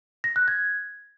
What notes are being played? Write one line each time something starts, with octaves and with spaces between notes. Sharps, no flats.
A#6
F#6
G#6